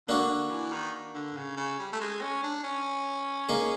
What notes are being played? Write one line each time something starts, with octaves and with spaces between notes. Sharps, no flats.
D3 A#3 D4 F#4
D3
E3
D#3
D3
C#3
C#3
G3
A3
G#3
C#4
D4
C#4
A#3 D#4 G#4